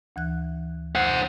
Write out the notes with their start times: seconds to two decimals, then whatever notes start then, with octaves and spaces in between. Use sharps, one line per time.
0.16 D2 E3 F#6
0.95 C5 F#5